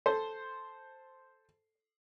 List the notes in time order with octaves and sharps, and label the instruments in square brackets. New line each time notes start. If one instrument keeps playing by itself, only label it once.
[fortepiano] A4 C5